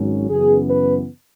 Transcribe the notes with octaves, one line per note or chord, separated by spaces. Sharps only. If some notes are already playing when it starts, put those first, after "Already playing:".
Already playing: G#1 G#2 F#3 C#4
F#2 C#3 E3 B3 G#4
B4